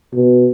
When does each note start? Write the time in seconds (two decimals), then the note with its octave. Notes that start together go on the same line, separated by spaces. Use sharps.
0.13 B2